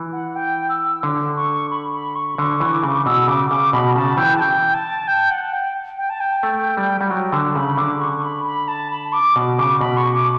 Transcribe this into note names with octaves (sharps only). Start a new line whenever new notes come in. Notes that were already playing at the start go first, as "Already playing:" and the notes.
Already playing: E3
F#5
G5
E6
D3
C#6
B5
B5
C#6
D3 C#6
E3
D6
C#3
B2 E6
C#3 D6
C#3 D6
B2 B5
C#3 A5
E3 G5
A5
G5
A5
G5
F#5
G5
G5
A5
G5
A3
G3
G3 F#5
F#3 G5
D3 A5
C#3 B5
D3 D6
C#6
B5
B5
A5
B5
D6
B2
C#3 D6
B2 B5
C#6
D6